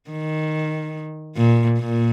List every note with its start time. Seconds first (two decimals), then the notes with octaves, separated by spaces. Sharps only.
0.10 D#3
1.37 A#2
1.79 A#2